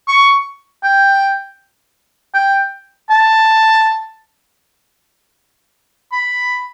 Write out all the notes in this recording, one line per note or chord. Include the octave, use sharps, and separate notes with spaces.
C#6
G5
G5
A5
B5